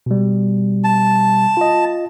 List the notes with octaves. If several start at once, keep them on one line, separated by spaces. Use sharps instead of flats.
B2 G3
A5
F4 D#5